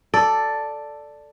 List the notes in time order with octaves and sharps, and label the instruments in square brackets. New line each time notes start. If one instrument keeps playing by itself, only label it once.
[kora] A4 D5